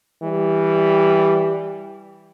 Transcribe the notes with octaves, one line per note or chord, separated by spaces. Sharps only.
E3 G3